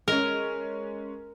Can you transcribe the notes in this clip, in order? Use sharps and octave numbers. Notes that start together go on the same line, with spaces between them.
G#3 C#4 A#4